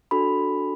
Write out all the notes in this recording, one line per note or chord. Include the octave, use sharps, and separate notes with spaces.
D4 F#4 A4 B5